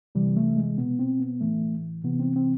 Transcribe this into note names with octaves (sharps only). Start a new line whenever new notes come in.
C3 E3 G3
A3
G#3
B2 B3
C4
B3
A2 E3 A3
C3 E3 B3
C4
C4